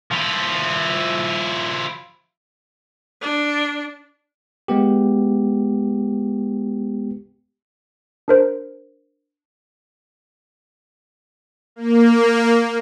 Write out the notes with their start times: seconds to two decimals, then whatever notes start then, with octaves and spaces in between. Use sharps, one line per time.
0.12 F3 E4
3.22 D4
4.68 G#3 B3 G4
8.28 D4 A#4 C5
11.76 A#3